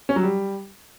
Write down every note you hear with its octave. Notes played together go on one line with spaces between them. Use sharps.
C#4
F#3
G3